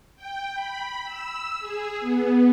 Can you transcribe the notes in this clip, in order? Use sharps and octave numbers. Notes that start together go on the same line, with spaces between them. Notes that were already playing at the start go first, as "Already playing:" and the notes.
G5
B5
E6
G#4
B3